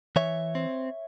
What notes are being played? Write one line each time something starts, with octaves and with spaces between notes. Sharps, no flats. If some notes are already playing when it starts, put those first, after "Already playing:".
E3 C#5 E5
C4